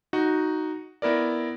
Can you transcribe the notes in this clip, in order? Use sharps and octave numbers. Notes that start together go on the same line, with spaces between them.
D#4 F#4
B3 E4 A#4 D5